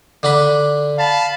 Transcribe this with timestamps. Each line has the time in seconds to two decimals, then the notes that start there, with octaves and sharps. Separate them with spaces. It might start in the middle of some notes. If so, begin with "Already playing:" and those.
0.23 D3 D4 B5
0.98 F5 A5 B5